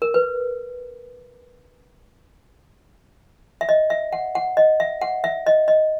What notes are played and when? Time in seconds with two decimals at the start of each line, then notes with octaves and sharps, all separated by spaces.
0.02 A#4
0.14 B4
3.61 E5
3.69 D#5
3.90 E5
4.13 F#5
4.35 F#5
4.57 D#5
4.80 E5
5.01 F#5
5.24 E5
5.46 D#5
5.68 D#5